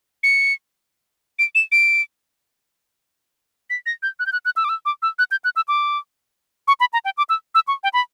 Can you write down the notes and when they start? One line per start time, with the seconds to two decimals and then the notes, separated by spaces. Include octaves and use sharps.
0.23 C#7
1.39 D7
1.55 E7
1.72 D7
3.70 B6
3.86 A#6
4.03 G6
4.19 F#6
4.26 G6
4.32 F#6
4.45 F#6
4.56 E6
4.64 D6
4.69 E6
4.85 D6
5.02 E6
5.19 F#6
5.31 G6
5.44 F#6
5.56 E6
5.68 D6
6.68 C#6
6.80 B5
6.93 A#5
7.05 G5
7.17 D6
7.29 E6
7.55 E6
7.68 C#6
7.83 G5
7.93 B5